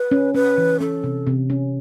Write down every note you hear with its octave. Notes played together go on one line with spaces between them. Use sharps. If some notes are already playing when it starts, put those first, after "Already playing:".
Already playing: B4
C#4
C#4 B4
E3
C#4 A4
C3
C3
C#4